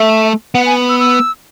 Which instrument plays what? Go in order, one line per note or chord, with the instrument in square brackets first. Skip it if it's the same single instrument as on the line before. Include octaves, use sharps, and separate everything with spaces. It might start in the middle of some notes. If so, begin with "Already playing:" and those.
Already playing: [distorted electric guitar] A3 [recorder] E5
[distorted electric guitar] B3 [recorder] F#5
[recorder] G#5
E6
E6